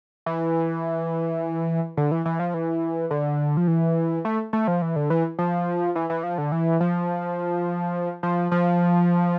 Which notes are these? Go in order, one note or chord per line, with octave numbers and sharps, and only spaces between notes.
E3
D3
E3
E3
F3
E3
D3
F3
E3
A3
A3
F3
E3
D3
E3
F3
E3
E3
F3
D3
E3
F3
F3
F3